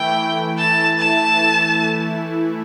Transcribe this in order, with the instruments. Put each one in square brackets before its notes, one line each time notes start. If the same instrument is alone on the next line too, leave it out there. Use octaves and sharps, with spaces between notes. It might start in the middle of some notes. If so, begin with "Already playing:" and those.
Already playing: [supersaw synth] E3 A3 E4 [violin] G5
[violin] A5
A5